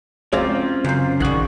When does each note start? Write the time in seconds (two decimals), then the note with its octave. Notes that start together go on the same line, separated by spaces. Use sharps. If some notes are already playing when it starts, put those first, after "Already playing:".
0.33 F3 F#3 G#3 C4 C#4 F4 D5 A#5
0.84 F#2 C#3 C5
1.20 A#1 D#3 G3 G#4 F#5 C#6